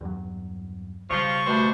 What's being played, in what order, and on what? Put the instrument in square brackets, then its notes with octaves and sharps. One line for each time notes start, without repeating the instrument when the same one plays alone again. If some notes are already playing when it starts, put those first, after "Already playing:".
[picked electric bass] E2 G2 F#3
[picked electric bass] B1 C#3 G3 [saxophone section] G2 F3 F4 [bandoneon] C#6
[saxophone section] G2 C5 [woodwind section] B2 A3